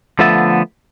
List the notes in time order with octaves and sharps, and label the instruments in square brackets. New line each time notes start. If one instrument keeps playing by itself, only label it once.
[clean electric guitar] D3 F3 A3 B3 E5 A5